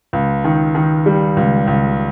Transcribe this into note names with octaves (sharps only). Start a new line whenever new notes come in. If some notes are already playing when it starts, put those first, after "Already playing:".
C#2
D#3
D#3
G3
C#2
C#2